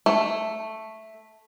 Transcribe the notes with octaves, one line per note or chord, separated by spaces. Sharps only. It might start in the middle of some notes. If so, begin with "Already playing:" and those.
A3